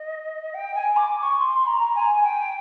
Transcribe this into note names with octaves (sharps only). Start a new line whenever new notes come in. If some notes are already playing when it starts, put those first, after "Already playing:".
Already playing: D#5
G5
G#5
D6
D6
C#6
C6
A#5
G#5
G5